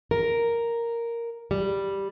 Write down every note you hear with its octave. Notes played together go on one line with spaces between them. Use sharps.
A#4
G3